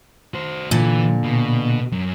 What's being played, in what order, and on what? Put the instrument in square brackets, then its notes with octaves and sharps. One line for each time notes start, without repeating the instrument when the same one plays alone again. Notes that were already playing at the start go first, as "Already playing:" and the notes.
[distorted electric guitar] F#4 C5
[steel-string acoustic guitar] A#2 D3 [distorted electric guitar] E3
[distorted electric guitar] B2
F#2